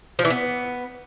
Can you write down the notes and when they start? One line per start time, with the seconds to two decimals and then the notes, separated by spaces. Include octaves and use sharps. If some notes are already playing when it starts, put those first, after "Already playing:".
0.19 F3
0.25 E3
0.30 B3